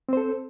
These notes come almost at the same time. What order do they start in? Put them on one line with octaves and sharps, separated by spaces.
C4 C5 A4